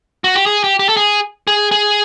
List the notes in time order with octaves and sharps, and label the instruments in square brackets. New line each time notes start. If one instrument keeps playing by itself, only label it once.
[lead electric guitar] F#4
G4
G#4
G4
G4
A4
G#4
G#4
G#4